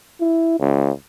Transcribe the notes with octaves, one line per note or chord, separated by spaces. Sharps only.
E4
C#2